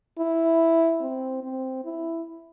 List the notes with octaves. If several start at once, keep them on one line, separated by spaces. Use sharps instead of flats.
E4
C4
C4
E4